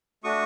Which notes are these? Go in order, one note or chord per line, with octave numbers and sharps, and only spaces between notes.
A3 D4 F#4 C#6 D#6